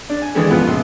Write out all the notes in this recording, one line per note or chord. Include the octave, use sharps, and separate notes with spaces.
D4
G#5
D#3 E3 G#3 D4 G4 A4
C#2 F#2 F3 B3 F4 F#5
A#1 C#3 C6